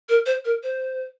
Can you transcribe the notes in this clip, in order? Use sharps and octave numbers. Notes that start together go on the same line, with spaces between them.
A#4
C5
A#4
C5